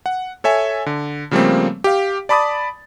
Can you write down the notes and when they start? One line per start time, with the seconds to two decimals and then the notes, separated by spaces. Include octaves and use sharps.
0.06 F#5
0.44 A4 C#5 E5 G#5
0.86 D3
1.31 C#3 F3 G3 A3 A#3 C4
1.84 G4 F5
2.29 D5 A5 B5 D6 D#6 A6